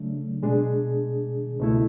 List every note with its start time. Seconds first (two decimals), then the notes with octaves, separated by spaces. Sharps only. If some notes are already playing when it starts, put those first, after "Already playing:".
Already playing: C#3 F#3 A3 D4
0.42 B2 G#3 D4 G#4
1.59 C#2 B2 A3 E4